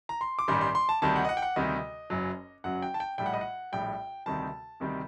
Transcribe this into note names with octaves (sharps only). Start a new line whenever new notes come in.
A#5
C6
D6
A1 G2 D#3 G3 C6
C6
C6
A5
D2 C3 D#3 G3 A5
F#5
D#5
F#5
G5
F#5
D2 C3 D#3 G3 D#5
F#1 F#2 F#3
F#1 F#2 F#3 F#5
G5
A5
G5
A#1 A2 G3 G5
F#5
D#5
F#5
A#1 A2 G3 G5
D2 C3 D#3 G3 A5
D2 C3 D#3 G3